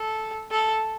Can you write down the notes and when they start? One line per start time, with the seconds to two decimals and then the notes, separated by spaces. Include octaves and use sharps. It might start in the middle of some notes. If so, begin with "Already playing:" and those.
Already playing: A4
0.51 A4